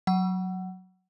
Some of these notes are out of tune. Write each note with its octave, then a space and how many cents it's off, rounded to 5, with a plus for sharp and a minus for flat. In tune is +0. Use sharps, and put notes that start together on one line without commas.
F#3 +0 F#5 +20